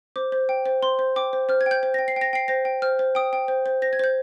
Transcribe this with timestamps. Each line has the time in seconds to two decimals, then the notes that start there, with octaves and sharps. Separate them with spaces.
0.16 C5 D6
0.32 C5
0.49 G5
0.66 C5
0.83 C5 C6
0.99 C5
1.16 G5 D6
1.33 C5
1.49 C5 F6
1.61 G#6
1.66 G5 G6
1.83 C5
1.94 G5 A#6
2.08 C7
2.16 G5 A#6
2.33 G5 C7
2.48 C5 A#6
2.65 G5
2.82 C5 F6
2.99 C5
3.15 G5 D#6
3.33 G5
3.48 C5
3.66 C5
3.82 C5 A#6
3.93 G#6
3.99 C5 G6